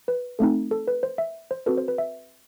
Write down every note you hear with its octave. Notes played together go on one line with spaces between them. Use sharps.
B4
A3 C4 D#4 A4
A4
B4
C5
E5
C5
C4 F#4 A4 B4
C5
B4
E5